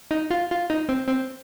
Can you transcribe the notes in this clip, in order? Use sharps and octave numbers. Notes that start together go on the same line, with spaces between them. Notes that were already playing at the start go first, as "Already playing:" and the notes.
D#4
F4
F4
D#4
C4
C4